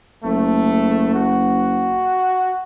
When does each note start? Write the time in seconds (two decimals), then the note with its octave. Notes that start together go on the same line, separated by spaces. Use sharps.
0.24 F#1 A3
1.14 F#4